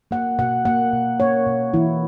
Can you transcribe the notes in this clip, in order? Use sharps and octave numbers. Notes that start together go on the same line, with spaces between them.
A#3 F#5
B2 F#5
A#3 F#5
B2
A#3 C#5
B2
E3 E4